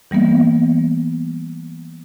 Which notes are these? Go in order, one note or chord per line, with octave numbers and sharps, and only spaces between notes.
E3 G3 A#3 B3